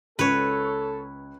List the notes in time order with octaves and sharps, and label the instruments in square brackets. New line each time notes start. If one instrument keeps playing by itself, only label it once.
[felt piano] C#2 [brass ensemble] A4 [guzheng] B4 C#5